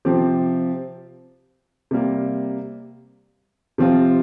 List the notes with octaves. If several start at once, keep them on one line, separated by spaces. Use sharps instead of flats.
C3 F3 C4 G4
C3 G3 A#3
C3 F3 C4 F4